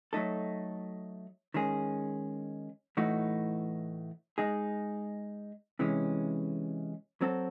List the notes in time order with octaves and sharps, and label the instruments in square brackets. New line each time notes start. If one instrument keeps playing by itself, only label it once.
[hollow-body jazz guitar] F#3 A3 D#4 A4
D#3 G#3 C#4 G#4
A2 E3 A3 D#4 F#4
G#3 D#4 G#4
C3 E3 G#3 C#4
F#3 C4 F#4 A4